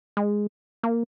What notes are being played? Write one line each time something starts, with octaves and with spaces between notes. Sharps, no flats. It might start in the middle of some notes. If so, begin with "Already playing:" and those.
G#3
A#3